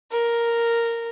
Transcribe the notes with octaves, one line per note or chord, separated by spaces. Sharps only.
A#4